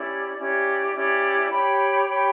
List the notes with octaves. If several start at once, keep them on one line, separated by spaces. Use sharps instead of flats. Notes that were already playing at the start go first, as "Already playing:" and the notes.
Already playing: C#4 E4 G4 D5
C#4 E4 G4 D5
C#4 E4 G4 D5
G4 C#5 G5 B5
G4 C#5 G5 B5